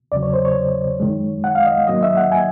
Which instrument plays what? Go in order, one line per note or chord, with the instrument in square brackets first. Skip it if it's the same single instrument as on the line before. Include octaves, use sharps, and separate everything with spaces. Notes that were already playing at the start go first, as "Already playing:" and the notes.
[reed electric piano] E2 C#3 F#3 D5
C#5
C5
C#5
F#2 D#3 G#3
F#5
F5
D#5
G#2 D#3 F#3 A#3 D#5
E5
F#5
G#5